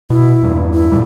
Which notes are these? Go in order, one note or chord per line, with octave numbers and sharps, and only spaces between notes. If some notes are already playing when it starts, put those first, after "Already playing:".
B2 E4
E2 G2 A#2
E4
A#2 D3 G3